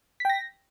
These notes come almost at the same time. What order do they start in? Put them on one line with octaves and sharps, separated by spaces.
B6 G5 A#6